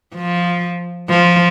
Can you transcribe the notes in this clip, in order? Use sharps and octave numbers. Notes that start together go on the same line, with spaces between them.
F3
F3